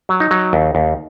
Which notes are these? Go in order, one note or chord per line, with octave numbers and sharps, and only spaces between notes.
F#3
D#4
F#3
D#2
D#2